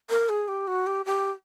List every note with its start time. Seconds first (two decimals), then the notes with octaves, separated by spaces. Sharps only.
0.10 A#4
0.29 G#4
0.48 G4
0.67 F#4
0.87 G4
1.06 G4